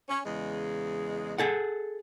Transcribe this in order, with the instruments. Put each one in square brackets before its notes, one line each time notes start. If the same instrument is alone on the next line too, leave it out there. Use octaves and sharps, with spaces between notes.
[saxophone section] C#4
E2 C#3 G#3
[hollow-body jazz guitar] G#4 A4 F#5